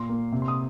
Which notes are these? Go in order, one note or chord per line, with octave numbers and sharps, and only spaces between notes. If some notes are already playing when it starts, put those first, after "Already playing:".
Already playing: A#2 C6
A#3
C3
C6
D#6